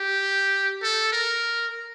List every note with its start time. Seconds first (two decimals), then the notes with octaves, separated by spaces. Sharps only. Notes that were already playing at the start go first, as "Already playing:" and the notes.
Already playing: G4
0.83 A4
1.12 A#4